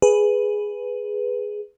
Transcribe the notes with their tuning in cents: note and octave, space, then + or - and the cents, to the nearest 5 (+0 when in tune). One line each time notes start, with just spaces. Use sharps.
G#4 +0 B4 +0